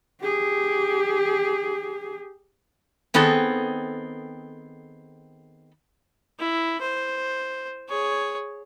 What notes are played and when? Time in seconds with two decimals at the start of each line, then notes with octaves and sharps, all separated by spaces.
0.21 G4 G#4
3.14 D#3 B3 C4 G#4 A4
6.39 E4
6.81 C5
7.89 G#4 C#5